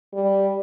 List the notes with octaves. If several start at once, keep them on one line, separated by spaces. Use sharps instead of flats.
G3